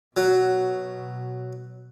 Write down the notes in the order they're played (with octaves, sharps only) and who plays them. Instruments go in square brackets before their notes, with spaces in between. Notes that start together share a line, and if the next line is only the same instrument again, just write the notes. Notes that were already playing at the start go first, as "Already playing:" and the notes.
[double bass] B2 [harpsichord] F#3